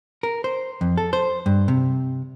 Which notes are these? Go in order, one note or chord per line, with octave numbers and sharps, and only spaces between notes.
A#4
C5
F2
A4
C5
G2
C3